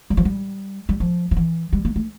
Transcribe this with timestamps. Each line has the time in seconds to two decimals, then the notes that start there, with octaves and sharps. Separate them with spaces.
0.10 G3
0.17 F3
0.25 G3
0.89 G3
1.00 F3
1.31 F3
1.36 E3
1.73 G3
1.85 A#3
1.96 A3